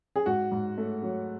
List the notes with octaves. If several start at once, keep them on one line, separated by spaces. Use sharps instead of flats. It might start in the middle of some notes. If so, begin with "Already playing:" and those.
G#4
G#2 F#4
G#2
A3
F#3